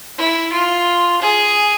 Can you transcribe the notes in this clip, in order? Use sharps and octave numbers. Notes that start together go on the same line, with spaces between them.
E4
F4
G#4